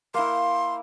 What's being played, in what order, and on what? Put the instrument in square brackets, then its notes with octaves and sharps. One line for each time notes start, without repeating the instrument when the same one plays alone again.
[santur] A#3 E4 [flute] C6